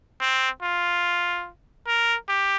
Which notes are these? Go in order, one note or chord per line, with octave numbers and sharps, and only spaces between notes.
C4
F4
A#4
G4